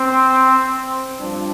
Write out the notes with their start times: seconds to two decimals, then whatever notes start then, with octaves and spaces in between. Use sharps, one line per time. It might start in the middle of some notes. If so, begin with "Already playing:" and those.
Already playing: C4
1.19 G2 F3 C4 D4